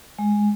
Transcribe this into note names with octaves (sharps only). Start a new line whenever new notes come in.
G#3